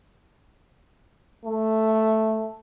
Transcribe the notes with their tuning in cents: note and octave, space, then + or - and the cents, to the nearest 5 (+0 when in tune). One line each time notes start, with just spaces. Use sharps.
A3 +0